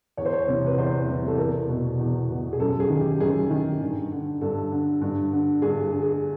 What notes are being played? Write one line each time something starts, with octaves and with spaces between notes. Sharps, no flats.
E2 C#5
C5
C#5
C3 E3
B4
E2 C5
C3 E3
A4
E2 A#4
B2
E2
B2
G#4
F#2 A4
G#4
D#3
G4
F#2 G#4
D#3
G2
D3
G2 A4
D3
G2
D3
G2 G#4
G#4
D3
G#4